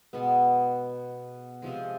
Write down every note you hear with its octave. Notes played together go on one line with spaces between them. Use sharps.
B2 G#3 B3
C3 F3 G#3